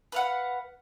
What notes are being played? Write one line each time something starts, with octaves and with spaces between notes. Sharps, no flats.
B4 F5 F#5